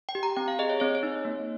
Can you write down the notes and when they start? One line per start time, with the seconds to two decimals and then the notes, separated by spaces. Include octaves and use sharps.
0.09 G5
0.15 G4
0.23 A#5
0.36 C4 G5
0.48 F5
0.59 G#4 D#5
0.69 C#5
0.80 C4 C#5
0.95 C#5
1.03 D#4
1.25 A#3